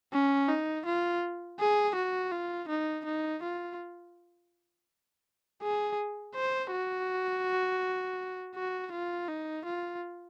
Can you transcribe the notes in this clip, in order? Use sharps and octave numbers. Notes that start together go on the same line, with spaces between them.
C#4
D#4
F4
G#4
F#4
F4
D#4
D#4
F4
G#4
C5
F#4
F#4
F4
D#4
F4